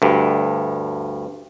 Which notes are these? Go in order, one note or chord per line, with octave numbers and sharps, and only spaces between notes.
D2 G2